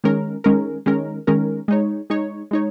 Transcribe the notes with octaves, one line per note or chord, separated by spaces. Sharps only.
D#3 G#3 C#4 A#4
D#3 G#3 C#4 A#4
D#3 G#3 C#4 A#4
D#3 G#3 C#4 A#4
G#3 D#4 C#5
G#3 D#4 C#5
G#3 D#4 C#5